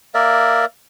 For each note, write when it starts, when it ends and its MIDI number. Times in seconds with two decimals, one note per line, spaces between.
0.14 0.65 58
0.14 0.65 70
0.14 0.65 74
0.14 0.65 76